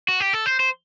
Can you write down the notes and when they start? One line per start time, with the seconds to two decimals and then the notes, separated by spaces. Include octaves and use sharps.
0.08 F#4
0.20 G4
0.33 A4
0.46 C5
0.60 C5